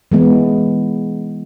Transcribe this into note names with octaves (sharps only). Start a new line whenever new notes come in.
E3 G#3 B3